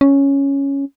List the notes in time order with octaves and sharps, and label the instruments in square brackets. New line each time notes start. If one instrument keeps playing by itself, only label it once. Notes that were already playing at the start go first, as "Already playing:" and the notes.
[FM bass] C#4